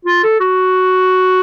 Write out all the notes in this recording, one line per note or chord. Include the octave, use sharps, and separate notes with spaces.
F4
A4
F#4